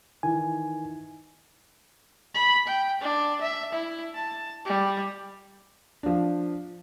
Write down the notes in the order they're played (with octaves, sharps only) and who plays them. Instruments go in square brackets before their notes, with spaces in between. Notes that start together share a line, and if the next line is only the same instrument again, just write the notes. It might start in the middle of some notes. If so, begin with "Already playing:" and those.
[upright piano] D#3 E3 [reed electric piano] G#5
[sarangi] B5
G5
D4
E5
E4
A5
G3
[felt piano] F3 D4